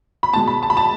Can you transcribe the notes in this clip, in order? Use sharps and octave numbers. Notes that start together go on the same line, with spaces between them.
B5
B2 G#3 A5
B5
A5
B5
A5